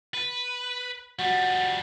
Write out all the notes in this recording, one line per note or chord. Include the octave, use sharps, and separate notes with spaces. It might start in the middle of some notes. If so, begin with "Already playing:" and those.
B4
F3 G3 F#4